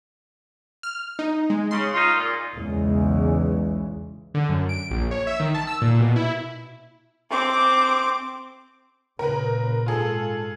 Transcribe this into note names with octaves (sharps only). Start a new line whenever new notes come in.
F6
D#4
G#3
C#3 C6
D#4 F4
A#2
B1 E2 C#3 E3 G#3
D3
F#2
D7
A#1
C#5
E5
D#3
A5
E6
A#2
B2
E4
C4 D6
A#2 C#3 A#4 B4
G#2 F4 G#4 A4